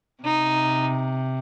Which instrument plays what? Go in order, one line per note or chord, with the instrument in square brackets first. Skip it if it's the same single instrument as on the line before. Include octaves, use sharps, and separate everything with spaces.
[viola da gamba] C3 [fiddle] D#4